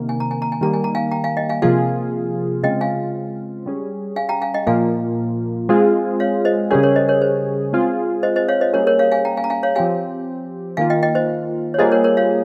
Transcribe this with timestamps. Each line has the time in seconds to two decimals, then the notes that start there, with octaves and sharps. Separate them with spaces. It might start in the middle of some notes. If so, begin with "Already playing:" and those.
Already playing: C3 D#3 A#3
0.09 G#5
0.20 A#5
0.31 G#5
0.42 A#5
0.52 G#5
0.61 D#3 G3 A#3 A#5
0.73 G#5
0.84 A#5
0.95 F5 G#5
1.12 G5 A#5
1.24 F5 G#5
1.37 D#5 G5
1.49 F5 G#5
1.62 C3 F3 A#3 F4 G#4 F5 G#5
2.63 C#3 G#3 C4 F4 D#5 G5
2.81 F5 G#5
3.66 G3 C#4 G#4
4.16 F5 G#5
4.29 G5 A#5
4.42 F5 G#5
4.54 D#5 G5
4.67 A#2 F3 A#3 F4 F5 G#5
5.69 G#3 C4 F4 G#4
6.20 C#5 F5
6.45 C5 D#5
6.71 C#3 G3 C#4 G#4 A#4 C#5
6.83 A#4 C#5
6.96 C5 D#5
7.08 A#4 C#5
7.22 C5
7.73 G#3 C4 F4 G#4
8.23 C5 D#5
8.36 C5 D#5
8.48 C#5 F5
8.61 C5 D#5
8.73 G3 A#3 C#4 G#4 A#4 C#5
8.87 A#4 C#5
8.99 C#5 F5
9.12 F5 G#5
9.25 G5 A#5
9.37 F5 G#5
9.44 A#5
9.50 F5 G#5
9.63 C#5 F5
9.75 F3 C4 G4 F5 G#5
10.77 D#3 A#3 F4 F5 G#5
10.90 D#5 G5
11.03 D#5 G5
11.15 C5 D#5
11.74 C#5
11.78 G3 A#3 F4 G#4 C5 D#5
11.92 A#4 C#5
12.04 A#4 C#5
12.17 C#5 F5